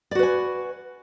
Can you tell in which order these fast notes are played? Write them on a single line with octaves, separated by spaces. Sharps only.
D5 F#4 B4 G#5